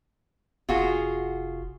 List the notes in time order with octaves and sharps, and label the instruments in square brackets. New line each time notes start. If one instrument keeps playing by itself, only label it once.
[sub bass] F1 [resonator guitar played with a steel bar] F4 F#4 G#4